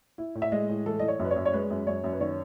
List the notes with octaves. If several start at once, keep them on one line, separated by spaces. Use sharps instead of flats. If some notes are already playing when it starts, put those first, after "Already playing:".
E4
A2
E5
G#3 D#5
A2
E3 A4
E3 D#5
C#5
F#2 B4
C#5
F#2
C#5
G#3 B4
F#2
F#2 C#5
F#2
B4
D#3 C#5